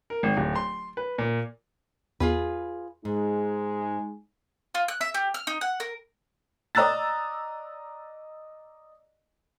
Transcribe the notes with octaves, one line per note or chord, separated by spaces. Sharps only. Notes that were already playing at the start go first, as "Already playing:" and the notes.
A#4
G#1
D1
C6
B4
A#2
E2 F4 G#4 B4
G#2 G#3 D#4
F4
F#6
E5
G4
F6
D#4
F#5
A#4
D5 D#5 A#5 E6 F#6 A6